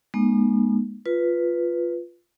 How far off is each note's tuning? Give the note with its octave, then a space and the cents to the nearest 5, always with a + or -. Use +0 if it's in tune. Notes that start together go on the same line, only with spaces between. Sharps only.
G#3 +10 B3 -45 D#4 -45
F4 +0 B4 +0